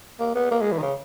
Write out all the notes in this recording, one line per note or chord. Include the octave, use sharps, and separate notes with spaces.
A#3
B3
A#3
G#3
E3
D#3
C#3